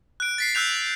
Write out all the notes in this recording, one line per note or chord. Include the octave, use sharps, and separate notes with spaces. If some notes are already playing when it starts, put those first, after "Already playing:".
F#6 D7
A6 B6 C7
E6 F#6 G6 F7